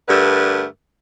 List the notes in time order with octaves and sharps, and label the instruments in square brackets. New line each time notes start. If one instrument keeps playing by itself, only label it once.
[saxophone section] G2 D3 A3 A#4 B4